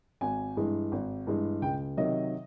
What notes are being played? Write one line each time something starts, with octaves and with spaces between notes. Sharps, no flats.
G#1 G#5
G2 E3 G#3
G#1
G2 E3 G#3
C#2 G5
C3 D#3 F#3 D#5